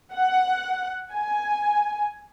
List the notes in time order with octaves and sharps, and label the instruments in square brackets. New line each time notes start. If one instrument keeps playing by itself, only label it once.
[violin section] F#5
G#5